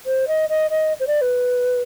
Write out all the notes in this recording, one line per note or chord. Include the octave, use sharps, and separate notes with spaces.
C5
D#5
D#5
D#5
C5
D5
B4